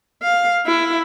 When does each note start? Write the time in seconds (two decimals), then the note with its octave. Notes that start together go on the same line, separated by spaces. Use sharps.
0.23 F5
0.66 E4